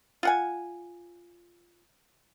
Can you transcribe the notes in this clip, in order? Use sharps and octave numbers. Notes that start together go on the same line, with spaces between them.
F4 F#5 G#5